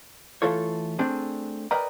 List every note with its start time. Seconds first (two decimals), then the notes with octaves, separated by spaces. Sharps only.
0.42 E3 A3 F4 A4 C#5
0.99 A3 C4 D4 G#4
1.71 A#4 B4 D5 D#5 G5 A#5